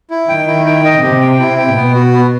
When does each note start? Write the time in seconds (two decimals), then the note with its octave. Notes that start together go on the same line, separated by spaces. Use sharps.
0.11 E4
0.28 D#3 G5
0.47 E4
0.66 G5
0.85 D#5
1.02 C3 G4
1.20 G5
1.39 E4
1.58 G5
1.76 B2 B3
1.94 F#4
2.13 B3